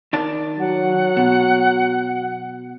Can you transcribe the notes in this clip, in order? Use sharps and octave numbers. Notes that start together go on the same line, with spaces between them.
D#3 D5 A5
F#3 F#5
B2